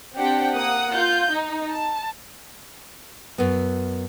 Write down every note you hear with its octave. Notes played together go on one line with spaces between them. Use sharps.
C4 D4 G4 F#5 G5
A#3 F#5 D#6
F4 G6
D#4
A5
F#2 B3